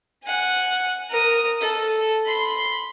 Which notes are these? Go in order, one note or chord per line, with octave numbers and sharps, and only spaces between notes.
F#5 G#5
A#4 D#6
A4
B5 C6